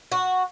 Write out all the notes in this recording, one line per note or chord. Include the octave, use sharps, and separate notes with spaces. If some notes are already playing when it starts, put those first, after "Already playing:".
F#4